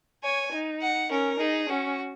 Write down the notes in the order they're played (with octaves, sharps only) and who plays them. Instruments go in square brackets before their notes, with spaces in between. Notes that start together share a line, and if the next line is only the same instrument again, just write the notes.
[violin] C#5 [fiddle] G#5
[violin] D#4
[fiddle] F#5
[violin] C#4 [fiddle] A#4
[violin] D#4 [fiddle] G#4
[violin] C#4 [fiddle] F#4